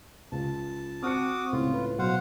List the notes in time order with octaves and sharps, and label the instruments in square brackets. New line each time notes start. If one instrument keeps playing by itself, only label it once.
[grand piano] C#2 [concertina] A5
[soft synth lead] C4 [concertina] F#4 D6 D#6 [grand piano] F6 F#6 C#7
[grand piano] C#2 A2 [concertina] F4
[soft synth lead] B4
[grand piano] B2 [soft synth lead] F#3 [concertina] C5 F5 F#5